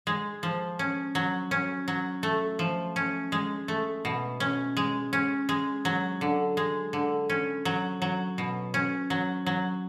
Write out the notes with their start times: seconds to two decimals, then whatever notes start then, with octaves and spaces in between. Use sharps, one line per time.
0.07 G#3
0.43 F3
0.79 C#4
1.15 F#3
1.51 C#4
1.88 F#3
2.23 A3
2.59 F3
2.96 C#4
3.32 G#3
3.68 A3
4.05 B2
4.40 C#4
4.77 G#3
5.13 C#4
5.49 G#3
5.85 F#3
6.21 D3
6.57 G#3
6.93 D3
7.30 C#4
7.65 F#3
8.02 F#3
8.38 B2
8.74 C#4
9.10 F#3
9.46 F#3